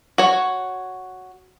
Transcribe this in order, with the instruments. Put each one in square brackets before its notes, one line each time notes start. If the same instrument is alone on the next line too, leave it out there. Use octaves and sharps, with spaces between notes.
[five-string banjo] F#4 C#5